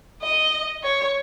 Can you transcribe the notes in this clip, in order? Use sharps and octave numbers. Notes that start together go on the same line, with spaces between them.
D#5
C#5